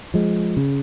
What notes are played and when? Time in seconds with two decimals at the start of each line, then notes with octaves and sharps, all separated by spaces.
0.14 F3 G#3
0.57 C#3